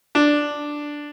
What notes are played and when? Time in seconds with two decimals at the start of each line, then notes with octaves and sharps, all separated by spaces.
0.15 D4